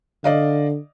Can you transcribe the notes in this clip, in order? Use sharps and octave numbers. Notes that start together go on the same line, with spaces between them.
D3 D5 D#5 F5